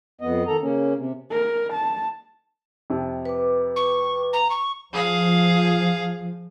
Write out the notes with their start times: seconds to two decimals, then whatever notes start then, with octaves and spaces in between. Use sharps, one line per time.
0.21 F2 B3 D#5
0.47 D#3 A4 A#5
0.62 C#3 A#3 C#4
0.96 C3
1.31 A#4
1.73 A5
2.90 F2 C3
3.25 B4 D6
3.76 C#6
4.33 A#5
4.50 C#6
4.93 F3 G#4 F5